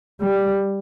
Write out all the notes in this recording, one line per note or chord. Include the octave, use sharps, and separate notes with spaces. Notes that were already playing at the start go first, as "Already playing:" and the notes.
G3